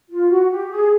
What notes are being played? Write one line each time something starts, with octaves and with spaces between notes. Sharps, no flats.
F4
F#4
G4
G#4